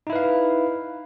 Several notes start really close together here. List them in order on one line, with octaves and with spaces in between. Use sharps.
D#4 E4 B4 F5